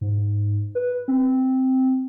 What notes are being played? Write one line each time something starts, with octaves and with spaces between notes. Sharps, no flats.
G#2
B4
C4